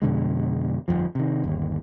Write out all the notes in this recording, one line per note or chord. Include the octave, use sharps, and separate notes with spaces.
F2 B2 D3 G#3
G1 C2 F2 F3
C3 D#3
G1 D#2